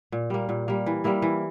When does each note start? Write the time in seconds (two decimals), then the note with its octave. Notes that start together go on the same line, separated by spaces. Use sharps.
0.12 A#2
0.30 G3 A#3
0.49 A#2
0.68 G3 A#3
0.86 E3
1.04 G3 A#3 E4
1.22 E3